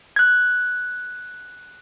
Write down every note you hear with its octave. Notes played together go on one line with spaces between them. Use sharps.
F#6 G#6